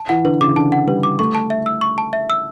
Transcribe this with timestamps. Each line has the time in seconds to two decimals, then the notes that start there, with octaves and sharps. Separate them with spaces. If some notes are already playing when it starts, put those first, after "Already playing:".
Already playing: A5
0.09 E3 F#5
0.24 D3 B4
0.41 C#3 D6
0.48 E3
0.56 D3 A5
0.72 F#5
0.87 G3 B4
1.03 D6
1.19 A3 C#6
1.35 A5
1.50 E5
1.66 E6
1.81 C#6
1.98 A5
2.13 E5
2.30 E6